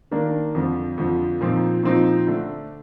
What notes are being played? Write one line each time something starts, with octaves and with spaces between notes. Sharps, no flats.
D#3 A#3 D4
F2 D3 F3
F2 D3 F3
A#2 F3 C4 D#4
A#2 F3 C4 D#4
D3 A3 D4